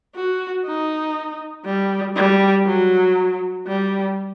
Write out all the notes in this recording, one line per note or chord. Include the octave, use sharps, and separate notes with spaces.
F#4
D#4
G3
G3
F#3
G3